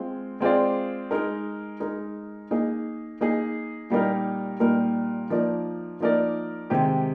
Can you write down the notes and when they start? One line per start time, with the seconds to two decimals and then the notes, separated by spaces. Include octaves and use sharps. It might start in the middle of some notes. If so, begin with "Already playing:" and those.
Already playing: G#3 C4 F4
0.40 G#3 C4 F4 G#4 D5
1.11 G#3 D#4 A#4
1.80 G#3 D#4 A#4
2.51 A#3 D#4 G#4
3.21 A#3 D#4 G#4
3.90 A#2 G3 A#3 D#4 A#4
4.60 A#2 G3 A#3 D#4 A#4
5.30 F3 A#3 D#4 A#4 D5
6.00 F3 A#3 D#4 A#4 D5
6.70 C3 D#3 G#3 C4 G4